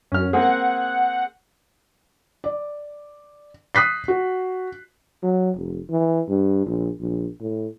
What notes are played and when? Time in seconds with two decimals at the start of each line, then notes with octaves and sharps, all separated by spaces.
0.12 F#2 C#4 F6
0.33 A#3 C4 G#4 F#5
2.44 D5
3.75 D#6 F#6 B6 C7
4.08 F#4
5.23 F#3
5.57 F1
5.90 E3
6.28 G2
6.66 A#1
7.01 A#1
7.41 A2